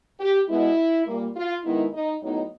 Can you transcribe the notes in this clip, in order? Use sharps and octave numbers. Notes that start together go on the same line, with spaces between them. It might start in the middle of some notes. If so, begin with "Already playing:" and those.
G4
B2 G#3 B3 E4
A#2 G3 A#3
F4
D#3 G#3 B3 D#4 E4
D#4
A2 F#3 B3 D#4